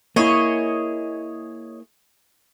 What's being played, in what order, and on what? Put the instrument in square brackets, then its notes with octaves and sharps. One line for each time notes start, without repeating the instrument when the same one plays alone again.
[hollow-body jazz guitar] A#3 E4 [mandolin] G#4 C#5 D#5